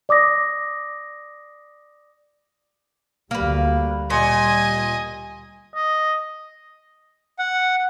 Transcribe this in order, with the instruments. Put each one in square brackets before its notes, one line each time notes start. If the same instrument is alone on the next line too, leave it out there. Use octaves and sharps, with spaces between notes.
[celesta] D5 D6 D#6 A#6
[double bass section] D2 G3 [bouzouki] A#3 B4
[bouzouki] A#2 [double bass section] G3 [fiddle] D#5 G#5
[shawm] D#5
[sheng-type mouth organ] F#5